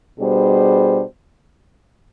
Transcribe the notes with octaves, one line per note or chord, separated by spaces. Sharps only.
B2 G3 D4 G#4 C5